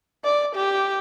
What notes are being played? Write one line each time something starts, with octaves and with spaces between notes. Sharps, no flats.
D5
G4